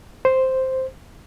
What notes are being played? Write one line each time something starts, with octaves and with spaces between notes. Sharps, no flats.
C5